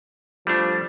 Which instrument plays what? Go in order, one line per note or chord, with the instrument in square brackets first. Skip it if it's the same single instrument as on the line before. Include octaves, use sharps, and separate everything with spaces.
[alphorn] F3 [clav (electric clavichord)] G3 A3 D4